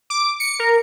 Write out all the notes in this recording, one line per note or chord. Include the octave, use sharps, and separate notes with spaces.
D6
C#7
A#4